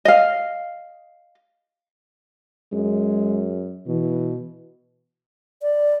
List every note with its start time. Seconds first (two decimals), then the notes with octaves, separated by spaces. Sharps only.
0.05 D#5 F5
2.73 F#2 G#3
3.87 B2 E3
5.62 D5